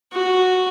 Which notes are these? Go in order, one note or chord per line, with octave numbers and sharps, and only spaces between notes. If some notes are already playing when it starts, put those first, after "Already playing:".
F#4